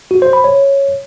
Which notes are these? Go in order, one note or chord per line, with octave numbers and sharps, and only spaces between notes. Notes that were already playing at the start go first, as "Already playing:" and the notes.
F#4
C5
B5
C#5